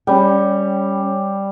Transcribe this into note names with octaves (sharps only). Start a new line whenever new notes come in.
G3 C#4 G5